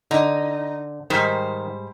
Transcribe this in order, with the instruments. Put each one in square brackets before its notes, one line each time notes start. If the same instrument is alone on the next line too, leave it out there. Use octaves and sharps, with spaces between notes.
[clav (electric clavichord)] D3 [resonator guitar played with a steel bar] D#4
[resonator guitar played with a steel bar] G#2 G3 C5 [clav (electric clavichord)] D#3